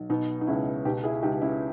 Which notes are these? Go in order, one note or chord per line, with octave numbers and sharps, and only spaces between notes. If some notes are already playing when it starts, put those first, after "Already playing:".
Already playing: B1
B2 B3 D#4
D#4
C#2 C#4 E4
B2 D#4 G4
E4 G#4
C#2 D#4 G4
C#4 E4